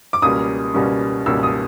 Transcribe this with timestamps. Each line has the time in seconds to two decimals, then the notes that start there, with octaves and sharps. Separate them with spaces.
0.13 D6
0.22 C#2 B2 G3 A#3 C#4 D#6
0.74 C#2 B2 G3 A#3 C#4
1.26 C#2 B2 G3 A#3 C#4 E6
1.43 D#6